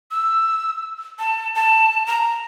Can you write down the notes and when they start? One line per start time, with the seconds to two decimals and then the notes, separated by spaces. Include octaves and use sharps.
0.11 E6
1.19 A5
1.55 A5
2.06 A#5